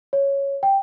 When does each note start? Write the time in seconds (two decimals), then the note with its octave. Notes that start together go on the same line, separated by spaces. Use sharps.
0.13 C#5
0.63 G5